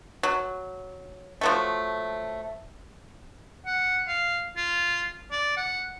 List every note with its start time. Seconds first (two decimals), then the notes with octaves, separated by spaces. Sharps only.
0.23 F#3
1.41 F3 F#3 A3
3.67 F#5
4.08 F5
4.57 F4
5.31 D5
5.57 F#5